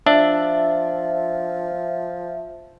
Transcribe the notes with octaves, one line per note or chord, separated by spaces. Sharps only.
F3 D4 E5